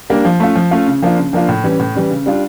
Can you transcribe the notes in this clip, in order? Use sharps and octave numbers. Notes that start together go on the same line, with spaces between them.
G3 A#3 D4
F3
A3 C#4 F4
F3
A3 C#4 F4
C#3
F3 A#3 D4 F4
C#3
F3 A#3 D4 F4
A2
E3 G3 C#4
A2
E3 G3 C#4
C#3
G3 D4 F4